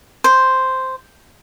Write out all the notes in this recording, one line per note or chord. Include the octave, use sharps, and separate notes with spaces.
C5